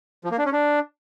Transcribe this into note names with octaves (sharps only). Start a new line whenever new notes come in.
F3
A#3
D4
C#4
D4